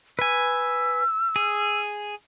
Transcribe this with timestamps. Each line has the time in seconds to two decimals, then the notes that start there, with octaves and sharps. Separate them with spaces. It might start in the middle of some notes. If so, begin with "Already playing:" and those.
0.19 B4 G#5 E6
1.36 G#4